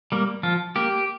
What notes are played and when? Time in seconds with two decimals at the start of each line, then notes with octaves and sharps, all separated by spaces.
0.12 G3 A#3
0.43 F3 F4
0.76 A#3 G4